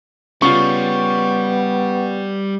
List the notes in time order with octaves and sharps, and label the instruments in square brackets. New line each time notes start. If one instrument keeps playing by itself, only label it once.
[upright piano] C#3 F4 [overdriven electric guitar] G3 [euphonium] B3 [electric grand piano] C#6